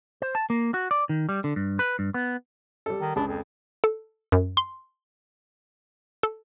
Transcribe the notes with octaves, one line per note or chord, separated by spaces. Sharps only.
C5
A5
A#3
F#4
D5
D#3
G3
D3
G2
B4
G2
B3
G3 A4
D#3
C#2 D4 G#4 B5
F2
A4
F#2
C6
A4